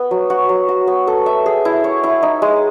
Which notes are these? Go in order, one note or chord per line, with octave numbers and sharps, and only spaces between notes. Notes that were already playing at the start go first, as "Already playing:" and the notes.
Already playing: B3
F#3
F#4
F#3
F#4
B3
A4
E5
G#4
E4
C#5
E4
D#4
G#3